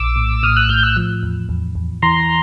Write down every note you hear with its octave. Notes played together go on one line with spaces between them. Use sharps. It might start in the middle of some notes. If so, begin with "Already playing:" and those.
Already playing: A#1 D6 E6
A2
A2 D#6 F6
E6 F#6
A2 F6 G6
E6 F#6
F3
E2
E2
E2
E3 A#5 C6